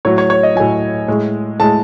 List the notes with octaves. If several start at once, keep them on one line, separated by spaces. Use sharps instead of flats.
A2 F#3 C#5
C#5
C#5
D#5
A2 F#3 G#5
A2 G#3
A2 G#3 A5